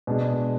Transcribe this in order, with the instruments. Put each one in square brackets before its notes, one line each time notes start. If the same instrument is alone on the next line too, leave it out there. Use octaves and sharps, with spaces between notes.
[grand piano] B2 G#3 D4 G#4